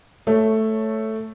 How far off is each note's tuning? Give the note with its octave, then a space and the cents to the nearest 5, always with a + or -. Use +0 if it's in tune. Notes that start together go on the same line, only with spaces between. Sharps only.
A3 +0 C#5 +0